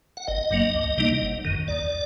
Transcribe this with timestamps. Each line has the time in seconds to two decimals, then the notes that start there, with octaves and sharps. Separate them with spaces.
0.17 F#5
0.27 G1 D#5
0.51 G2 F#3 A#3
0.74 D2
0.98 C3 G3 A#3 D#4
1.22 F#1
1.45 F#2 D#3
1.68 D#2 D5